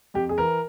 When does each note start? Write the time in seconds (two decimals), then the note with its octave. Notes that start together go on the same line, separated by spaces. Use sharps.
0.14 F2 G4
0.29 G#4
0.38 E3 A#4